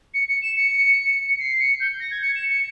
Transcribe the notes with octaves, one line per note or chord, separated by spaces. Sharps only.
C#7
C#7
E7
C#7
C7
C#7
G6
A#6
G#6
C#7
E7
C#7